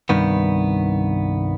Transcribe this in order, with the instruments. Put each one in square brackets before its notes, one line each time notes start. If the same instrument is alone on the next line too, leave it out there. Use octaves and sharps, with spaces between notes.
[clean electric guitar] C2 G2 D#3 B3